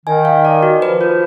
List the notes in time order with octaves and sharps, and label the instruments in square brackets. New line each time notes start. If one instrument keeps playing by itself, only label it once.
[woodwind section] D#3 [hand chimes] G#5
[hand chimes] F5
D5
F#4
[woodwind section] F3 [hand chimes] B4
[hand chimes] F4